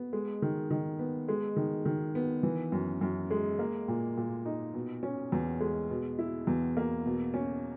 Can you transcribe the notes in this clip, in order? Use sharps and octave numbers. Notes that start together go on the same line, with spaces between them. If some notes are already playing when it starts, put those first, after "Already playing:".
Already playing: B3
G#3
D#3
D#3
B3
G#3
D#3
D#3
B3
E3
F#2
F#2
G#3
A#3
A#2
A#2
D#4
B2
C#4
E2
G#3
B2
E4
E2
A#3
B2
C#4